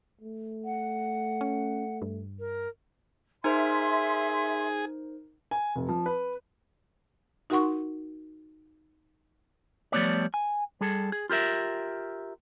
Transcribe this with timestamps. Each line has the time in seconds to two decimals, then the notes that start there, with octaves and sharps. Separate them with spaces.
0.21 A3
0.65 F#5
1.41 C#4
2.02 G2
2.39 A#4
3.44 D#4 G#4 A#4 C5 E5 C6
5.51 G#5
5.76 F1
5.89 F3
6.06 B4
7.50 D#4 F#4 A#4 F#5 C6 C#6
9.92 F3 G3 A3 B3 C#5 D5
10.34 G#5
10.81 G3 G#4 A4
11.12 G#4
11.29 F4 G4 A#4 E5